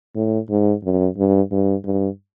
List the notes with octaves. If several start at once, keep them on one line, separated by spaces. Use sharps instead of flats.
A2
G#2
F#2
G2
G2
G2